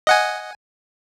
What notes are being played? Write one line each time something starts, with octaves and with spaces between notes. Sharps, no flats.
D#5 F#5 G#5